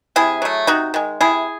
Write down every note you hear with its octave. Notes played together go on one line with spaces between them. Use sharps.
C3 E4 G#4
F#3 A3
C3 D#4 F#4
D#3 G#3
C3 E4 G#4